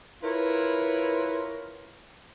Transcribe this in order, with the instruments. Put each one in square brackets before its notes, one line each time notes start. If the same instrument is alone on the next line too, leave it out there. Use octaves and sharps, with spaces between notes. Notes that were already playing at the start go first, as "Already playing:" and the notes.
[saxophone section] E4 F4 A#4 B4 C#5